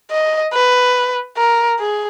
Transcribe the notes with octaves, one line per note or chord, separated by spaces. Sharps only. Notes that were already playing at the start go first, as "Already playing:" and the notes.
D#5
B4
A#4
G#4